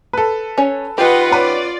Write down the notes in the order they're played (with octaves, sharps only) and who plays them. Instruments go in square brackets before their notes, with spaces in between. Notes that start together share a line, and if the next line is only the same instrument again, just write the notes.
[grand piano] A4 B4
[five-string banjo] C#4 C#5
[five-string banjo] D#3 G4 [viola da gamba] F4 [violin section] B4 D#5 F#5
[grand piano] C#4 B4 [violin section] D5